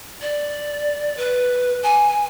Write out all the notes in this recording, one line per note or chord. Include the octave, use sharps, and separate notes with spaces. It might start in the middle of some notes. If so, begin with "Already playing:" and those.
D5
B4
G#5